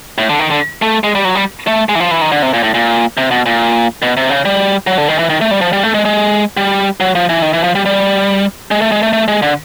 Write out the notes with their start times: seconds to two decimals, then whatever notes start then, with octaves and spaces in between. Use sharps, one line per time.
0.18 A2
0.30 D3
0.39 D#3
0.51 D3
0.82 A3
1.04 G#3
1.15 G3
1.25 F#3
1.35 G3
1.67 A3
1.89 G#3
1.95 E3
2.00 F3
2.11 E3
2.21 D#3
2.32 D3
2.42 C3
2.54 A#2
2.63 A2
2.74 A#2
3.17 C3
3.31 B2
3.46 A#2
4.02 B2
4.17 C3
4.30 C#3
4.45 G3
4.87 F#3
4.98 D3
5.08 D#3
5.19 E3
5.30 D#3
5.41 A3
5.51 G3
5.61 F3
5.73 G3
5.83 A3
5.94 G#3
6.05 G#3
6.57 G3
7.00 F#3
7.15 F3
7.29 E3
7.42 D#3
7.53 E3
7.64 F3
7.75 G3
7.85 G3
8.71 G#3
8.82 A3
8.92 G#3
9.03 A3
9.13 A3
9.28 G#3
9.42 D3